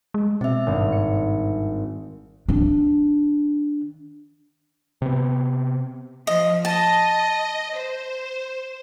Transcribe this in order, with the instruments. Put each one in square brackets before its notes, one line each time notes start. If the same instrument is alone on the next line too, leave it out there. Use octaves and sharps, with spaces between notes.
[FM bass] G#3
[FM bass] B2 [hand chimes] C4 E5
[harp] G#1 G2
C#7
[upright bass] D#3 D4
[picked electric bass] C3 B3
[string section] F3 [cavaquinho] D#5
[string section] D#5 [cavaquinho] A5
[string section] C5